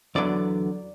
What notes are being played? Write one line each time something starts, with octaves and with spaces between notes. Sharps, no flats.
E2 D3 F#3 B3 D5